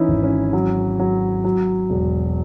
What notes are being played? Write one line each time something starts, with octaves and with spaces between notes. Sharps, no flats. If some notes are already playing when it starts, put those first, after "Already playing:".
Already playing: E3 C#4 D#4 E4
G#1
C#4
F#3
F#3
F#3
E1